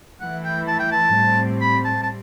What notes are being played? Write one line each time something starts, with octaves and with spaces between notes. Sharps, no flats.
E3 A3 E4 F#5
G5
A5
G5
A5
A2 G3 C4
B5
A5
A5